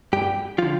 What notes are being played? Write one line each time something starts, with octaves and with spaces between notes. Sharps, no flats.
G2 G4
D3 F3 F4